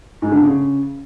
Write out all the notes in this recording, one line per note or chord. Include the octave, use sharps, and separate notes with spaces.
G#2
D3
C#3